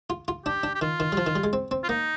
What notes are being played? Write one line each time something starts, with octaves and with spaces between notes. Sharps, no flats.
F4
F4
D4 G4
D4
G4
D#3 F4
D#3
G3
F3
D#3
G3
G#3
C4
C4
F4
A#3 D#4